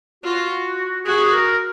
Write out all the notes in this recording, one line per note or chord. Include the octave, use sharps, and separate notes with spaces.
F4 F#4
F#4 G#4
A#4